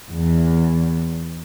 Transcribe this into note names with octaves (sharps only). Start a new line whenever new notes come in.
E2